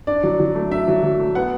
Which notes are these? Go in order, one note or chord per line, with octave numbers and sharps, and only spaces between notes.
D4 D5
F#3
F#3
A3
D4 E5
F#3
F#3
A3
B3 F#5